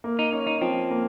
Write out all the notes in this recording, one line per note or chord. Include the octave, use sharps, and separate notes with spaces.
A#3
D#4
C#4
D#4
F3 C4
A#3